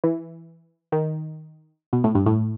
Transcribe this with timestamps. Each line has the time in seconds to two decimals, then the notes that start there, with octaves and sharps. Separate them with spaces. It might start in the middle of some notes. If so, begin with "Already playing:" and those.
0.04 E3
0.92 D#3
1.93 B2
2.04 A2
2.15 G2
2.26 A2